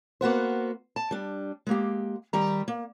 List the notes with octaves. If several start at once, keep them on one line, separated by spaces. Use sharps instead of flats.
A#3 B3 F#4 C5
A5
G3 D4
G#3 A#3 G4
D#3 G3 A#5
A#3